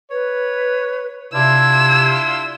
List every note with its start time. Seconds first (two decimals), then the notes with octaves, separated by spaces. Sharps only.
0.11 B4 C#5
1.34 C3 D4 E4 F4 E6 G#6